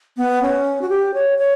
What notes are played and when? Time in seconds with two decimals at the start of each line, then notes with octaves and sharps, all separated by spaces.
0.17 B3
0.42 C#4
0.82 F#4
0.89 G4
1.14 C#5
1.38 C#5